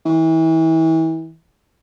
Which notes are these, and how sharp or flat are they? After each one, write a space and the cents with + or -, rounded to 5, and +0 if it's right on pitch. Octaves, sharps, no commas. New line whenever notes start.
E3 -35